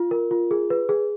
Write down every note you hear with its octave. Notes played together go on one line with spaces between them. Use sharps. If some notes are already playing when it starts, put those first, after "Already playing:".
Already playing: F4
A#4
F4
G#4
B4
G#4